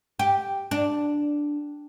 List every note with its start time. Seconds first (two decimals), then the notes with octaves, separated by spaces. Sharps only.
0.19 G4
0.71 D4